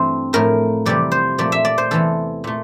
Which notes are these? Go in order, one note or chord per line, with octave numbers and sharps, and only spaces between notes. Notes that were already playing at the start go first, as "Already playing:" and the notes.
Already playing: G2 E3 A3 C4
A2 F3 A3 A#4
F2 C3 E3 G3 D5
C5
A#2 F3 A3 D5
E5
D5
C5
E2 C3 E3 A3 A4
A#2 A3